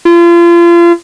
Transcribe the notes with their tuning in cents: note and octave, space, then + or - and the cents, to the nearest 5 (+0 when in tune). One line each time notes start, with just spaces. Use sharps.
F4 -35